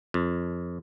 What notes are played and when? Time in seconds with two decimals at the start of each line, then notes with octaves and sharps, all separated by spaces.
0.14 F2